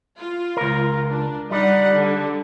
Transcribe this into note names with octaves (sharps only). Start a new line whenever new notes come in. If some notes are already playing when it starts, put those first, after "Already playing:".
F4
C#2 A#4
D4
G3 D#4 G4 D5 F#5
D3